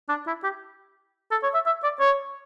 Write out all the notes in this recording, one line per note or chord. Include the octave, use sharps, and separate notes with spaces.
D4
E4
G4
A4
C#5
E5
E5
D5
C#5